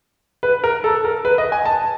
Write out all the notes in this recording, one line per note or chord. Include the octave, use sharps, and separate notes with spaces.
B4
A#4
A4
A#4
B4
D#5
G#5
A5